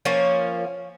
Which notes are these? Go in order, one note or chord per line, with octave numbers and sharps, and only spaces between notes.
F3 A#3 C#4 C#5